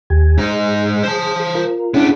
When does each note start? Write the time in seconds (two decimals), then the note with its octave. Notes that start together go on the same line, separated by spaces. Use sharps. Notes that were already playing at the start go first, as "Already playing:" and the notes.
0.10 D#2 G4 G#5
0.38 G#2 D#4 G#4
1.03 C5 A5
1.55 F4 A#4
1.94 B3 C#4 D4 E4 G#4